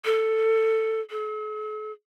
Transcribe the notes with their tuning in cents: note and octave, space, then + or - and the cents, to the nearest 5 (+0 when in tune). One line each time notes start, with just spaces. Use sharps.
A4 +10
A4 -45